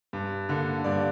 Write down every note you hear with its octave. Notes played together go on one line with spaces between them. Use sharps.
G2
D3 A#3
G2 D5